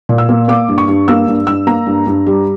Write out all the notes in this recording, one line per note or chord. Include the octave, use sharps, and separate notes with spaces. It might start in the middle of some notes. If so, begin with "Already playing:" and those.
A#2
E6
A#3
A#3 D6
G2
C#6
G2
A#3 E6
G2
G2 E6
A#3 A#5
G2
G2
G3